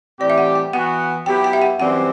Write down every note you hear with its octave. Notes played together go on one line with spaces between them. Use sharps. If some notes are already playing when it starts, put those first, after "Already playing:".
A2 E3 G3 C4 G4 D5
E5
F#5
G5
E3 B3 F#4 F#5
F#3 B3 E4 G4 G5
G5
E5
F#5
F#2 E3 G3 C4 F#5